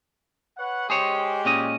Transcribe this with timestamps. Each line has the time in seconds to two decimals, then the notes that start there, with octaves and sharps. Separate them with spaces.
0.58 B4 C#5 F#5
0.90 G#3 G4 G#4 C5 C#5
1.45 A#2 C#4 D#5